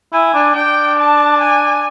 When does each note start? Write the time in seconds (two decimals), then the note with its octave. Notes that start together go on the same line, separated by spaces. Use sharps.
0.13 E4 G#5
0.34 D4
0.55 D4 G5
0.99 A5
1.41 G#5